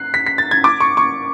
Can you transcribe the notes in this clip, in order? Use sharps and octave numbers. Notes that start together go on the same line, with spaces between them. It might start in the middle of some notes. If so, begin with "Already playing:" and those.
Already playing: F#6 C7
B6
B6
A6
G#6
D6
C#6
C#6